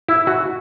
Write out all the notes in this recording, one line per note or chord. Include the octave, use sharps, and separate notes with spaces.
E4
F#4